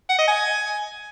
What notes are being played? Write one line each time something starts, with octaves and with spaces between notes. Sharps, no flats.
F#5
D#5
G#5